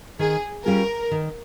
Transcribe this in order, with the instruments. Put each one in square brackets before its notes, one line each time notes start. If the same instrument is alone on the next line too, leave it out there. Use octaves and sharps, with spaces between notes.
[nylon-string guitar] D#3 [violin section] G#4
[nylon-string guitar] G3 C#4 F4 G#4 [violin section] A#4
[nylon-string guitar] D#3